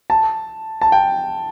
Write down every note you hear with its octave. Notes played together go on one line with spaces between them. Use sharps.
A5
A5
G5